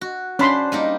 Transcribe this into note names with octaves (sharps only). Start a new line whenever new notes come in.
F#4
C#4 D4 C5 B5 C6
G3 A#3 D#4